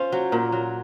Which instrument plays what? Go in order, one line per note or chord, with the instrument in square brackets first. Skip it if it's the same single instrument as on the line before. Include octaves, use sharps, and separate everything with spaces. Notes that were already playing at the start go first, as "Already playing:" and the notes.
Already playing: [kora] C#4 F4 [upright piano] C5
[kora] F#3
[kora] A#2 [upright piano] A#4
[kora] F#3